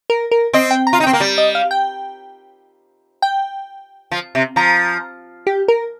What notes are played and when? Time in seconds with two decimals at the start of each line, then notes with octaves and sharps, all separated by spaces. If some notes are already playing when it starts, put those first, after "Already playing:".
0.10 A#4
0.31 A#4
0.53 C4 D#5
0.71 G5
0.87 A#5
0.93 F4
1.00 D#4
1.04 C4 G5
1.13 A#3
1.20 G3
1.38 D#5
1.55 F5
1.71 G5
3.22 G5
4.11 F3
4.35 C3
4.56 F3 A#5
5.47 G4
5.68 A#4